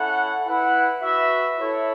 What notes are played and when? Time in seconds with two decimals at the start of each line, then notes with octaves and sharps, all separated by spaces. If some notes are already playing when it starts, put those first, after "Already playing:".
Already playing: C#4 E4 A4 F#5
0.46 E4 B4 F#5
1.02 F#4 B4 E5
1.58 E4 A4 C#5